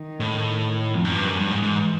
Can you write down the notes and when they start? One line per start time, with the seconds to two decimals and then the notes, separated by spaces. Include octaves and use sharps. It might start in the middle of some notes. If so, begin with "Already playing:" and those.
Already playing: D#3
0.20 A2
0.94 F2
1.05 F#2
1.14 G2 F3
1.27 F#2
1.39 G2
1.51 G#2
1.62 G#2 E3